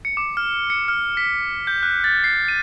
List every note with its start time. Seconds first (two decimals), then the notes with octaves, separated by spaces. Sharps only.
0.05 C#7
0.17 D6
0.37 F6
0.70 C#7
0.88 F6
1.17 B6
1.67 G6
1.83 F#6
2.04 A6
2.24 C7
2.48 D#7